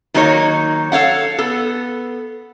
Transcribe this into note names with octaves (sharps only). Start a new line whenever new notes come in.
D#3 F#3 A#3 D#4 F4 C#5
A4 C#5 F5 F#5
B3 A4